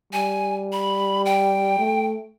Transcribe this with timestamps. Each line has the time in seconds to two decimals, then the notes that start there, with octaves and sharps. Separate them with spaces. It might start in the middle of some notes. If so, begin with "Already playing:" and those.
0.13 G3 G#5
0.72 B5
1.25 G5
1.79 A3